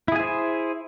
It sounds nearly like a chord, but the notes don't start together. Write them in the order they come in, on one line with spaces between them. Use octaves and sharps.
E4 G#4 G#5 C5